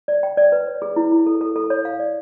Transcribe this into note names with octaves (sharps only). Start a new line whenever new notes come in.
D5
G5
D5
B4
C#5
G#4
E4
E4
A4
A4
A4
C#5
F5
D5